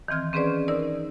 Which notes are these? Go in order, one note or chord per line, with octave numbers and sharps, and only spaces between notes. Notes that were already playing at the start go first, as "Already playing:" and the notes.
D#3 E3 C4 F6 G#6
C4 C#4 G#4 B4 C5 D5
D#4 A#4 D5 E6